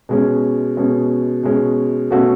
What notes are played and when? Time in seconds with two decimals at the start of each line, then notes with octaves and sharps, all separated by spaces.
0.09 B2 G#3 C#4
0.77 B2 G#3 C#4
1.43 B2 G#3 C#4
2.11 B2 A3 C#4 F#4